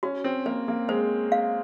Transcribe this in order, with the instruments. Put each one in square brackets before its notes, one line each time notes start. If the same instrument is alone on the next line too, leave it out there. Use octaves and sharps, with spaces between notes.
[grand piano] C#4 [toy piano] F#4
[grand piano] C4
[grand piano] A#3 [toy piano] C5
[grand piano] A#3
[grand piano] G#3 [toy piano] C5
[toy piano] F5